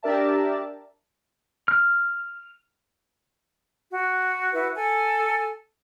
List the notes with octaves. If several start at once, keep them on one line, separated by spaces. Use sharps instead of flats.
D4 G4 A#4 D5 E5 A5
F6
F#4
E4 F#4 B4
A4 G#5